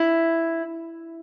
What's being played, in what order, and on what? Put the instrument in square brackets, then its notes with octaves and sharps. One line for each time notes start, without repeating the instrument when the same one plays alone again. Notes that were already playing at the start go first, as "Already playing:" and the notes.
Already playing: [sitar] E4